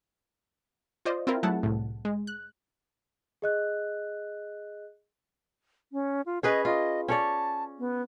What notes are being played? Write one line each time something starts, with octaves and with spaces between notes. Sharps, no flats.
F4 C5 D5 D#5
C4 E4 F4 A#4
F#3 A3 E4 G#4 F#5 A5
C2 A2
G#3
F#6
G#4 D#5 F#6
C#4
F4
C#4 G#4 B4 D#5
F4 D#5
C#4 C#5 D5 A5
B3